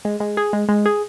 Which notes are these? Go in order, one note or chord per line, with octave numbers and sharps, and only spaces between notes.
G#3
G#3
G#4
G#3
G#3
G#4